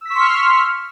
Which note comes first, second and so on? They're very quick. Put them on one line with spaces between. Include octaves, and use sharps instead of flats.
E6 B6 C#6 C6 F6